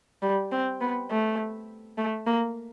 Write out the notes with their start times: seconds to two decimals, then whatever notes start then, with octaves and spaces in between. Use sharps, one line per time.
0.23 G3
0.52 C4
0.81 B3
1.11 A3
1.98 A3
2.27 A#3